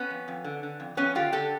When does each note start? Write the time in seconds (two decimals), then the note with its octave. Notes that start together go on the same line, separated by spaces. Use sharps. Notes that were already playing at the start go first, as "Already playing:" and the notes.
Already playing: B3 C#4
0.10 F2
0.28 F2
0.44 D3
0.63 D3
0.80 F2
0.97 F2 B3 C#4
1.15 D3 F4 G4
1.33 D3 G4 A4